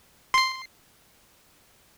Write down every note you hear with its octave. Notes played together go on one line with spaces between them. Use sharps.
C6 C7